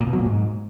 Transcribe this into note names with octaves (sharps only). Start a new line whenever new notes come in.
A#2
B2
F#3
A#2
G#2